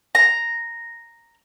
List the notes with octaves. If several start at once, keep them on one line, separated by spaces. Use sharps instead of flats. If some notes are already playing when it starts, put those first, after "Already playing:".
A#5